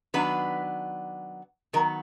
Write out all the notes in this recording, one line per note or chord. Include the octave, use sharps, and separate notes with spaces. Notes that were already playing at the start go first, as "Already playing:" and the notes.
D#3 F#3 B3 D4 B4
D#3 F#3 B3 A#4